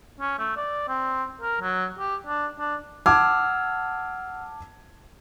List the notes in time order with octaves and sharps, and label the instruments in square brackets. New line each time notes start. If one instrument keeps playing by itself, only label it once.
[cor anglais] C#4
A3
D5
C4
A#4
F#3
G4
D4
D4
[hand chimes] F#5 E6 F6 [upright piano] A5 D6 G#6